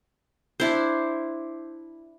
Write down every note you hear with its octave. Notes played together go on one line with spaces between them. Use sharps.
D4 E4 C5